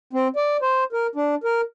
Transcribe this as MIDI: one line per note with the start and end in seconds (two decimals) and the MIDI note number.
0.13 0.28 60
0.36 0.57 74
0.62 0.84 72
0.93 1.07 70
1.16 1.35 62
1.44 1.61 70